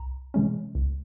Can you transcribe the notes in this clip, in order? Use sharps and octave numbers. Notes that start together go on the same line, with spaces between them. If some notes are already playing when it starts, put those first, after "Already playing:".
Already playing: C2 A#5
C3 E3 G#3 C#4
C#2